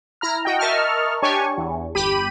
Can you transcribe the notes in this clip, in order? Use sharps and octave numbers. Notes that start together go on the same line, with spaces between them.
E4 A#5 F6
F#4 D#5 G5
A#4 D#5 E5 A5 C#6 F6
D4 G4 C#5 G#5 A5 C#6
E2
G1 G4 B5 D#7